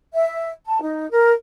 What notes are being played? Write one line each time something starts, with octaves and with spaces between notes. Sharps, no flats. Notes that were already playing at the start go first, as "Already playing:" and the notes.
E5
A5
D#4
A#4